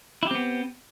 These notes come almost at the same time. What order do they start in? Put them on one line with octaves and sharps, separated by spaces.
E4 G4 C4 B3